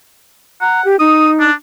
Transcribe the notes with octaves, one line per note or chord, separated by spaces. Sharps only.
F#5 A#5
G4
D#4 D#6
D4